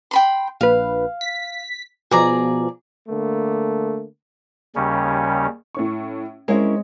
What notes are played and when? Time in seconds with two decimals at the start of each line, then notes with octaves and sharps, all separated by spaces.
0.11 G5 B5 C6
0.61 A#1 B4 F5
1.21 B6
2.11 B2 F3 G#4 D5 A#5
3.07 D3 A3 A#3
4.76 D#2 C#3 G3 C#4
5.75 A2 C#4 C#6
6.48 G#3 C4 C#4 E4 A#4 C#5